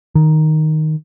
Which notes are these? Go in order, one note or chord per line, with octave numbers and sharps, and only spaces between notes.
D#3